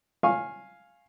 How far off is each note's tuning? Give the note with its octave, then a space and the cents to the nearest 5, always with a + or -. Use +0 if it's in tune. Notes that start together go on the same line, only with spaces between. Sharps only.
F5 +0 G#5 +0 C#6 -30